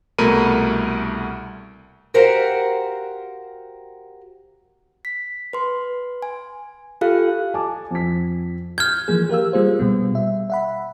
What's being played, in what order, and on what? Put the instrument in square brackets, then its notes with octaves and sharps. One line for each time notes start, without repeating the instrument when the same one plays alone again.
[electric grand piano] C2 B2 A3 A#4 B5 D#7
[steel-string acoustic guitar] F#4 G4 A#4 C5 F5 F#5
[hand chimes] B6
B4 C6
G#5
F4 G4 A4 F5 F#6
[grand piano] G#5 A5 D6
F2 B6
[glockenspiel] F6 G#6 [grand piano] G6
[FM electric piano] E3 F3 A#3 G#4
G4 A#4 F5 E6
G3 A#3 F4 G#4 C5
B2 G3 B3
E5
E5 F#5 B5